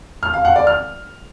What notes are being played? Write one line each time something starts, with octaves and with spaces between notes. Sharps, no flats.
F6
F5
F#5
D5
F6